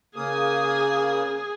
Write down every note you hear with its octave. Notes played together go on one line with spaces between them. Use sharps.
C#3 A#3 G#4 D#6